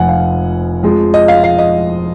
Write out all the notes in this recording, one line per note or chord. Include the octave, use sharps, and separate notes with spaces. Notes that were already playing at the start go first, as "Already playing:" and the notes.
Already playing: F1 F2 F3 F#5 G#5
F5
F2 F3 G#3
D#5
F5
F5
D#5